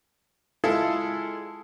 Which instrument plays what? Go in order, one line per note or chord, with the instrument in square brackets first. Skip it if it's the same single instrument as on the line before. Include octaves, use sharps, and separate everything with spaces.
[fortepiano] G#3 E4 F4 G#4 A4